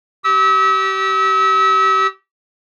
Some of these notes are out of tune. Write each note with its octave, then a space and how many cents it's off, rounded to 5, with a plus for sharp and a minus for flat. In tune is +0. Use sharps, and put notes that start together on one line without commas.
G4 -30 E6 -35